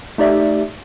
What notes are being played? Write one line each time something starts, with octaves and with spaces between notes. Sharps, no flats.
A3 D#4 G4 D5 E5